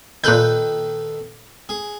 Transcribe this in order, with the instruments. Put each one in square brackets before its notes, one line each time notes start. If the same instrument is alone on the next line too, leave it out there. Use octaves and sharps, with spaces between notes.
[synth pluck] A#2 F#6 G6 [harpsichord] D#3 A4 B4
[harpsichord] G#4